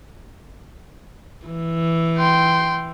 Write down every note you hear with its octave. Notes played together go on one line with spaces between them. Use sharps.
E3
G5 C6